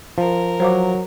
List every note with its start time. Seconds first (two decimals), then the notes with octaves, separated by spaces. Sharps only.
0.18 F3 A#4
0.60 F#3 C5 F5 D6